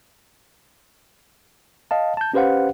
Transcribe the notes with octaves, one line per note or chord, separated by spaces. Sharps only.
D#5 F5 A5
A5 G6
C#4 G4 B4 C5 F5 F#5